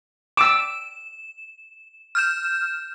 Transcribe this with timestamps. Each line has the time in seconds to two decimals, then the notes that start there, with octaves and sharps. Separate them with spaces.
0.37 D6 E6 E7
2.15 F6 G6 E7